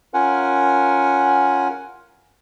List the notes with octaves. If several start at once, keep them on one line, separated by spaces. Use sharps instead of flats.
C#4 F4 A#4 F#5 G#5